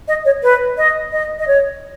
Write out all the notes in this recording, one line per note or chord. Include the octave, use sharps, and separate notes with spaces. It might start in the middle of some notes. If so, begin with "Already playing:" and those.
D#5
C#5
B4
D#5
D#5
D#5
C#5